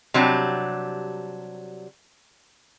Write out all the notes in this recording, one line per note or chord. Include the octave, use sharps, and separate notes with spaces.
C3 F#3 G3 D4